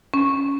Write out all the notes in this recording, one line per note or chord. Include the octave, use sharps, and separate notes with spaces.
C#4